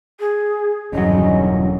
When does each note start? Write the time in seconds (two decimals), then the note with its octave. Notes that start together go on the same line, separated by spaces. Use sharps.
0.20 G#4
0.93 E1 G2 D3 D#3 F#3 C#4 D#5